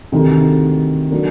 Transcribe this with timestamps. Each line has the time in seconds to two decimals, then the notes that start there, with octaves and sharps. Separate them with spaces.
0.12 D2 C3 D#3
1.11 D3 F#3 A#3 D4